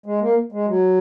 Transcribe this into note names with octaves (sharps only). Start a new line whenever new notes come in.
G#3
A#3
G#3
F#3